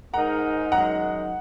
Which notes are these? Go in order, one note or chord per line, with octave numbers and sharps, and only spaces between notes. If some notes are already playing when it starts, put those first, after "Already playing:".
G#2 G#3 D#4 A#4 F#5 A#5
F#2 D#3 G#3 D#4 F#5 A#5